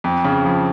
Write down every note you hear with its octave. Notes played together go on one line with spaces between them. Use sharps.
F2
C#3
F3